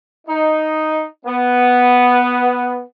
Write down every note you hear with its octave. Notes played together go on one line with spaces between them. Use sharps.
D#4
B3